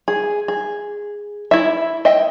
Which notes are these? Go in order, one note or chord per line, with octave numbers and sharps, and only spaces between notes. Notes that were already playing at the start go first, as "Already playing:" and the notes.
G#4
G#4
E4 E5
D#5 E5 G5